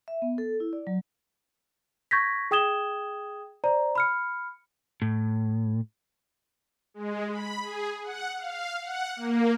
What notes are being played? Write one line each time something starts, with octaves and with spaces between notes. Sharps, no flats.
E5
B3
A4
E4
D5
F#3
C#6 G6 G#6 A#6 B6
G#4 G5 D#6 G#6 E7 G7
C5 D5 A#5
B5 F6 C#7
A2
G#3
B5
G#4
F#5
F5
F#5
A#3